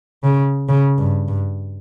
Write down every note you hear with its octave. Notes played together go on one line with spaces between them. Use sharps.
C#3
C#3
G2
G2